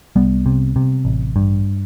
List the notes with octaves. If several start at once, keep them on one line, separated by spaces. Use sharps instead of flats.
C2 G3 B3
C3
C3
A1
G2